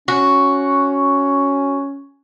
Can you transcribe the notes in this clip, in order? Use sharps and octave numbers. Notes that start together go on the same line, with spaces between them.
C#4 F#4